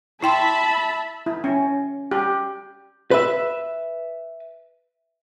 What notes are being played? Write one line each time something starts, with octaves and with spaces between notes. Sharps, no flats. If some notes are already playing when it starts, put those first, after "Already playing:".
E4 E5 G5 A5 B5 C6
E4
C#4
G4
B4 E5